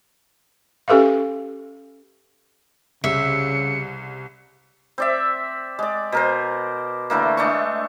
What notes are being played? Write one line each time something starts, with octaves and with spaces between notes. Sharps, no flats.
C#4 G4 A4 B4 E5 F5
C2 C#3 E5 C#7
C4 D5 E5
G#3 D5
B2 A#4 C5
D3 E3 A3 A#3
G#3 A3 D4 C#6